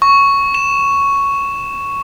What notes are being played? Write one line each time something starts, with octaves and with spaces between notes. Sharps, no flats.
C#6
E7